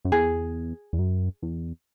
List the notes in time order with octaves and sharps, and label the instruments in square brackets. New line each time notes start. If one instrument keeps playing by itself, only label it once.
[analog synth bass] F#2
[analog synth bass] E2 [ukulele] G#4
[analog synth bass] E2
F#2
E2